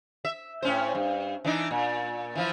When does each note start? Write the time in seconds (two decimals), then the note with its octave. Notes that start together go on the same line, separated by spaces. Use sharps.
0.25 E5
0.62 A2 C#4 C5
0.95 G2
1.45 E3 D4 D#4
1.71 A#2
2.35 E3 F3 E4